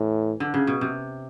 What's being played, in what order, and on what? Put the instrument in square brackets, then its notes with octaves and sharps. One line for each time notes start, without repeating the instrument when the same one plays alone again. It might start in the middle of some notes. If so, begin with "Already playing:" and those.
Already playing: [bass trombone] A2 [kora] E3
[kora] D3
C#3
B2
C3